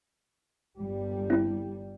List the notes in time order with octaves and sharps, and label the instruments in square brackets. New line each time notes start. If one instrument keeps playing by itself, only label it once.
[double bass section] G1 G3
[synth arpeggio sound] C4 E4